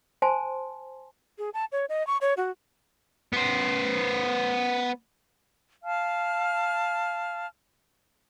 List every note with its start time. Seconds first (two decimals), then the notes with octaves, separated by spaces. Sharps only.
0.22 C5 G#5 A5 C6
1.38 G#4
1.54 A5
1.72 C#5
1.89 D#5
2.07 C#6
2.21 C#5
2.37 F#4
3.33 B3 C5
5.84 F5 A5 F6